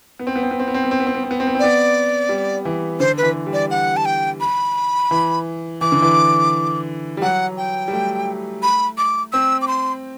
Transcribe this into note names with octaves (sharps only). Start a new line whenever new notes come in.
B3
C4
B3
C4
B3
C4
B3
C4
B3
C4
B3
C4
B3
C4
B3
C4
B3
C4
B3 D5
G3
E3
D3 C5
B4
E3
G3
D5
F#5
A5
G5
B5
E3
E3 D6
D3
E3
G3
F#3 F#5
G5
G3
A3
B5
D6
C4 E6
D6
C6